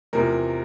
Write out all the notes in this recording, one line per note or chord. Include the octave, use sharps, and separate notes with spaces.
E2 C3 F3 A#4